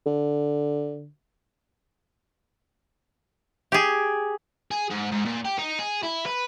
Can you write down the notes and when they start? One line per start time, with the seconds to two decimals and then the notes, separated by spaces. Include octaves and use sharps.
0.06 D3
3.72 G4 G#4
4.71 G#4
4.90 G#2
5.12 G#2
5.26 A#2
5.45 G4
5.59 D#4
5.79 G#4
6.03 E4
6.26 B4